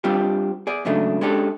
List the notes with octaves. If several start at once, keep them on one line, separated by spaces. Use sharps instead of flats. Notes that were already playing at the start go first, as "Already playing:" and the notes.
G3 C4 D4 F4 G4
G#4 D5
G#2 C#3 F#3 A3 D4
G#3 C#4 D4 G4 A4